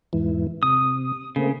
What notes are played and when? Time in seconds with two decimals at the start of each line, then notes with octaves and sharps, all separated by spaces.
0.13 E2 G#2 E3
0.63 C3 D#6
1.36 C#3 A3 A#3 C4